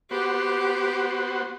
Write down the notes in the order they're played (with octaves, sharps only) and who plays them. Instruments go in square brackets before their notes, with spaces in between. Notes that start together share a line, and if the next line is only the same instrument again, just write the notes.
[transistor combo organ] B3 F#4 C5 [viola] G4